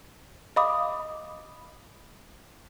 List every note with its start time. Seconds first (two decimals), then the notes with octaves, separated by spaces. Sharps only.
0.56 D#5 F5 B5 D6 D#6